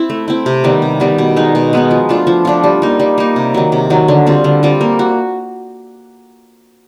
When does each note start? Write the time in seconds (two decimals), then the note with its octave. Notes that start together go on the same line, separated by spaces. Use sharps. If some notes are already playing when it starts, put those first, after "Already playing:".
Already playing: C4 E4
0.10 A3
0.28 C4 E4
0.46 C3
0.64 D#3 G3 B3
0.82 C3
1.00 D#3 G3 B3
1.18 B2
1.36 G#3 B3 D#4
1.55 B2
1.73 G#3 B3 D#4
1.91 F3
2.09 A3 D4 F4
2.27 F3
2.45 A3 D4 F4
2.64 G3
2.82 A#3 D#4
3.00 G3
3.18 A#3 D#4
3.36 C3
3.54 D#3 F#3
3.72 C3
3.90 D#3 F#3
4.08 D3
4.27 G3 C4 F4
4.44 D3
4.63 G3 C4 F4
4.81 A#3
4.99 F#4